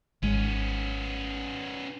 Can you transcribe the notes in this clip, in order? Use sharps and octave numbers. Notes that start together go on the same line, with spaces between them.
G#1 G#3 B3 C#4